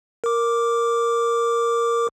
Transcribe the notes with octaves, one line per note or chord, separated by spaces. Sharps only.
A#4 D6